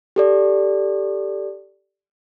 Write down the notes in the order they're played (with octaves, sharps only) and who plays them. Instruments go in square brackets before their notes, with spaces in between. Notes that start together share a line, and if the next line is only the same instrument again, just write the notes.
[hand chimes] G4 A4 D5